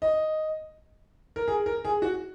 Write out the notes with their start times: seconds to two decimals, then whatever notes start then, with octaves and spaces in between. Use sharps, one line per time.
0.02 D#5
1.36 A#4
1.48 G#4
1.66 A#4
1.85 G#4
2.02 F#4